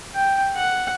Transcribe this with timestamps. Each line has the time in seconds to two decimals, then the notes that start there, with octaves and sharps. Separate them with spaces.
0.15 G5
0.56 F#5